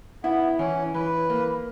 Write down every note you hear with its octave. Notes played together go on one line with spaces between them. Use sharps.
B3 E4
E3 C#4
E3 B4
A#3